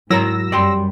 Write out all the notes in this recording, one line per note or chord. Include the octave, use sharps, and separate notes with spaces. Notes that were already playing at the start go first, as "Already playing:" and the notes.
G#2 F#3 E4 A#4 A#5 E6 A#6
F#2 G3 D5 G5 C6